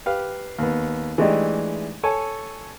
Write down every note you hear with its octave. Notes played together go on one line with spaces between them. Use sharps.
G4 B4 F5
D#2 B3
E3 G#3 A3 D4 D#4 G4
A4 C#5 G#5 A5